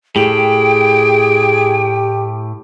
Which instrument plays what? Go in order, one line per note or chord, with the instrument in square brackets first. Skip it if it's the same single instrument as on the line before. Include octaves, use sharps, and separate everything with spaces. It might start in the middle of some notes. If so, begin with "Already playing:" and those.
[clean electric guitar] A2 [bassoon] G4 [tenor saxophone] G#4 [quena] G5